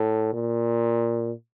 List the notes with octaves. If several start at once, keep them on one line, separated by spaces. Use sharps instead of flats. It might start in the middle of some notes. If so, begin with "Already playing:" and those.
Already playing: A2
A#2